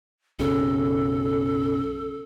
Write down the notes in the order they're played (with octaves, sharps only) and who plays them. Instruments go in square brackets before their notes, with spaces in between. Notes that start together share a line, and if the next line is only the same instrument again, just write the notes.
[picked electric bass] B1 F#2 C#3 [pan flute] A4